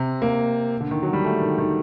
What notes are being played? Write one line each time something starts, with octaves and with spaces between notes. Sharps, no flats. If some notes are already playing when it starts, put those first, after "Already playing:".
Already playing: C3
A#3
D3
D#3
F#3
G3
A3
D#3
D#3